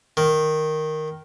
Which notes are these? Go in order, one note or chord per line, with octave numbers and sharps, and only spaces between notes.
D#3